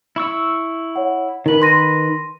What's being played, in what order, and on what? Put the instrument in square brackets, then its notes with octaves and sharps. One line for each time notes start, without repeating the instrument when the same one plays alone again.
[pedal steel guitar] E4 C#6 E6
[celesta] C#5 F#5
[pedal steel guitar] D#3 B4 [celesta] D#4 A#4 F#7
[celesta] C6 A#6 D#7